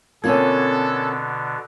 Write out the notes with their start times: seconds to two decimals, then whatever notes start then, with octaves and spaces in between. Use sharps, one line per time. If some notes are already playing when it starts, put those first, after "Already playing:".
0.24 B2 D3 A#3 C4 C#4 F4 A4 G#6